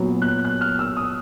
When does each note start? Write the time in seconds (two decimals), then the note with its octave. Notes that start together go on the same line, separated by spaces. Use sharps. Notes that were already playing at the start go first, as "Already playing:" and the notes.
Already playing: A#2 F#3 B3
0.22 F#6
0.45 F#6
0.61 F6
0.79 E6
0.97 D#6